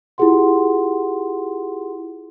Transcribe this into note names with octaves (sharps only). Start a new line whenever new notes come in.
E4 F4 G4 G#4 F#5 C6